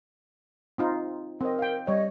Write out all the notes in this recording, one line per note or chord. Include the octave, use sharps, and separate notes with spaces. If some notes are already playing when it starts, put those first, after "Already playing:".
C4 D#4 F4
C4 A#4 D#5
F5 G5
G3 C#5 D#5